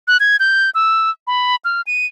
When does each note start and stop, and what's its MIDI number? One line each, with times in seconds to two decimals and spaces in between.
0.08 0.17 90
0.20 0.36 92
0.40 0.70 91
0.75 1.10 88
1.27 1.56 83
1.65 1.81 89
1.87 2.06 99